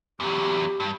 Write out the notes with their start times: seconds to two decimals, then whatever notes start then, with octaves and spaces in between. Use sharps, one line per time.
0.20 E2 F#3 G4
0.80 G2